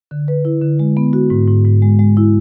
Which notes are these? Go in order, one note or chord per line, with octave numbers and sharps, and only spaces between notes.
D3
B4
E4
D3
G#3
B3
F#4
G#2
G#2
G#2
G#3
G#3
E4